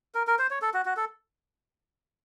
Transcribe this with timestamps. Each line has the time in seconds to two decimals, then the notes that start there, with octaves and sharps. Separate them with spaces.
0.15 A#4
0.27 A#4
0.39 C5
0.51 C#5
0.62 A4
0.74 F#4
0.86 F#4
0.97 A4